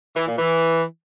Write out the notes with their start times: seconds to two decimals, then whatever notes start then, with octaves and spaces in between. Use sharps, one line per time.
0.17 E3
0.28 A#2
0.39 E3